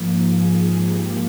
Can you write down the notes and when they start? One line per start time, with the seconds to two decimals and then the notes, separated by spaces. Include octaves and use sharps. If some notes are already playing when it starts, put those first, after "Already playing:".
Already playing: G#2 F3 A#3
0.25 G#4
0.87 G4